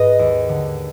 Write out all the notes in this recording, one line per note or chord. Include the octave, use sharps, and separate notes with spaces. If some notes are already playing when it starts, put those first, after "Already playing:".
Already playing: G#2 G#3 G#4 B4 D#5
D#2
D3